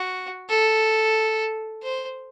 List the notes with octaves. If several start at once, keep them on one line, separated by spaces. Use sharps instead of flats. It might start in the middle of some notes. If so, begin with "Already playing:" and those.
Already playing: F#4
A4
C5